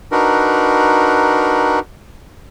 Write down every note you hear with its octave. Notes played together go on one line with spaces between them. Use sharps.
D4 D#4 F#4 A#4 B4